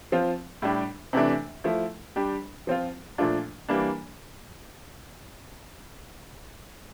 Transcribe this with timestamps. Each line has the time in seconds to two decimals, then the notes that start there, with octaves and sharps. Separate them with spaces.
0.12 F3 C4 F4
0.62 A2 G3 D4 G4
1.13 C3 E3 A3 D4
1.64 F3 A3 E4
2.16 G3 D4 G4
2.67 F3 C4 F4
3.18 A#2 F3 A3 D4 F4
3.69 E3 G3 A#3 D4